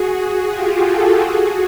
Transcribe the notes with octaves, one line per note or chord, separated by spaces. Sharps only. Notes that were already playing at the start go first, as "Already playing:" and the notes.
Already playing: F#4 G#4
F4 G4
G4 A4
F#4 G#4